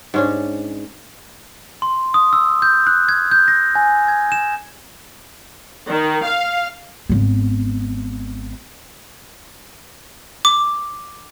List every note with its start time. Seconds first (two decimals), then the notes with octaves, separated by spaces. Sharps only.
0.14 G#2 C#4 D4
1.82 C6
2.14 D#6
2.33 E6
2.62 G6
2.87 F#6
3.09 G#6
3.31 G6
3.48 A#6
3.75 G#5
4.08 G#6
4.32 E7
5.90 D#3
6.24 F5
7.09 G#1 B3
10.45 D6